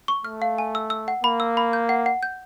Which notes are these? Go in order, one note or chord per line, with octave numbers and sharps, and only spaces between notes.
C#6
A3 F6
F5
G#5
E6
E6
F#5
A#3 B5
E6
B5
G6
F#5
F#5
G6